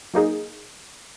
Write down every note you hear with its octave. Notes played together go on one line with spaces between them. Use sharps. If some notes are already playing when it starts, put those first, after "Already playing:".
F#3 A#3 D#4 G#4